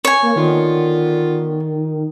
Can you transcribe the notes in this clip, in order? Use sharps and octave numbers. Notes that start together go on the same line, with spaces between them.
C#5 G#5
A#3
D3 D#3 B3 F4